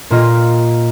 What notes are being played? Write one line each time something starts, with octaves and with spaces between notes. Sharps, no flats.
A#2 A#3 F4 D#5